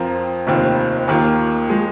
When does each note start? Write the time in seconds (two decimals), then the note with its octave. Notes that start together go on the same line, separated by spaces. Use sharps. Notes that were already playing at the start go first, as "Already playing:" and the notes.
Already playing: F2 F3 C4 F4 A#4
0.47 F1 D#2 D#3 C4 F4
1.08 D#2 D#3 A#3 F4
1.69 F3 G#3